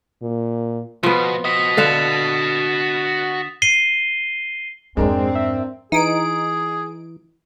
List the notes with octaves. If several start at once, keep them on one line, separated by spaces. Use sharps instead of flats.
A#2
B2 F3 B3
F#4 D#5 D#6 B6
D3 F5 F#5 A6 E7
C7 D#7 G7
F2 G#2 G#3 C4 D4 A#4
E5
E3 D#4 G#4 D7